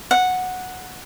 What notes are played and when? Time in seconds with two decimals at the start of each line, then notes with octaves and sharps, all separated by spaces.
0.11 F#5